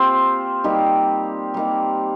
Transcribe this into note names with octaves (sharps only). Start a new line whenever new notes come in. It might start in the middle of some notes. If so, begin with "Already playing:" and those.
Already playing: A#3 C4 F4 G4 C5
G3 A#3 D#4 G4
G3 A#3 D#4